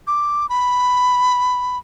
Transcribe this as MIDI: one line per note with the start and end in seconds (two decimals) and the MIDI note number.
0.07 0.49 86
0.49 1.78 83